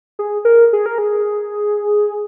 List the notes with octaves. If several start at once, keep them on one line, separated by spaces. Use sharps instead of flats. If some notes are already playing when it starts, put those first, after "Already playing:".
G#4
A#4
G#4
A#4
G#4